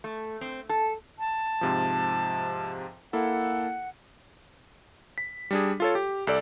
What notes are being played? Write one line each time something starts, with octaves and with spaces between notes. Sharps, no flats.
A3
C4
A4
A5
G#2 C3 F3
A#3 E4 A4 F#5
B6
G3 D4 G#4
F4 A4 C#5
G4
C2 A4 D5